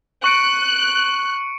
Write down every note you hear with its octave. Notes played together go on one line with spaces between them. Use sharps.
C#6 F#6 C#7 D7